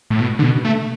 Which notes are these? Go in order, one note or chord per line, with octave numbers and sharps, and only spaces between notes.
A2
B2
D3
B2
A3